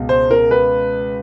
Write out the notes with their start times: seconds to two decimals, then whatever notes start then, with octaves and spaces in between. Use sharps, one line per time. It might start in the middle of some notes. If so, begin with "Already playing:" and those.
Already playing: C#2 B2
0.09 C5
0.31 A#4
0.51 B4